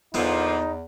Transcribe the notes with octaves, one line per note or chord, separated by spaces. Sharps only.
E2 A#2 D3 F3 B3 D#4 E4